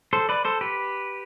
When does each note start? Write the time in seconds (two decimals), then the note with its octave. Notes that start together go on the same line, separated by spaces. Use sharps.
0.13 A4 C5
0.29 B4 D5
0.45 A4 C5
0.61 G4 B4